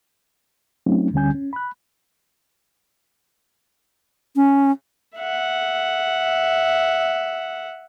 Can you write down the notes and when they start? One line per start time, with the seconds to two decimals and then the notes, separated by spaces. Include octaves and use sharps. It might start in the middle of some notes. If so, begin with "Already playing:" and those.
0.86 F#3 A3 C4 C#4 D#4 F4
1.13 D2 D3 G3 C#4 G#5 G6
1.34 C#4
1.53 B5 F#6
4.36 C#4
5.17 E5 F#5